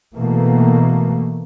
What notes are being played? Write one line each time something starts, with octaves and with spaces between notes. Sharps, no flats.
B2 E3 A3 A#3